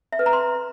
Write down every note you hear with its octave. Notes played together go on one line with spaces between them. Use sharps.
E5
B4
A#5
C6